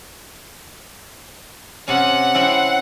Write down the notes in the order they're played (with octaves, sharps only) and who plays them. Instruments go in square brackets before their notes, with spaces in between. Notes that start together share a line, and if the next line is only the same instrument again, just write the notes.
[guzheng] C3 C#4 [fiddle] F#5
[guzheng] C4 C#4 E4